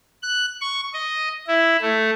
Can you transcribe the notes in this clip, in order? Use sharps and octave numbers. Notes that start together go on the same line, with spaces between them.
F#6
C#6
D#5
E4
A3